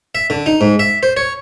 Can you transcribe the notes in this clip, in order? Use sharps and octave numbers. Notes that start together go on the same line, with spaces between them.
E5
D3
D#4
G#2
E5
C5
C#5